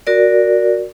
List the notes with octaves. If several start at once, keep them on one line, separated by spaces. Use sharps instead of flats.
F#4 A#4 D5